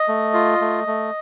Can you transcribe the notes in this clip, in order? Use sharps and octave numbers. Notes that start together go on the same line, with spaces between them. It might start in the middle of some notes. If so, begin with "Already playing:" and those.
Already playing: D#5
A3
F4
A3
A3